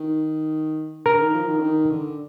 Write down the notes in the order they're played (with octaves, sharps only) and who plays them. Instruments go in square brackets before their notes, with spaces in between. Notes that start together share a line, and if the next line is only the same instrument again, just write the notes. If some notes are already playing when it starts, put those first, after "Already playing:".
Already playing: [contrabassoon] D#3
[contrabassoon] D3 [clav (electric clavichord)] A#4
[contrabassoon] D#3
F3
D#3
D3
D#3
D3